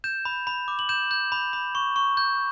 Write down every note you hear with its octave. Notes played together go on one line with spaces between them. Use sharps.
G6 E7
B5
B5
D6
F#7
G6 E7
G6
B5
B5
C#6
C#6
G6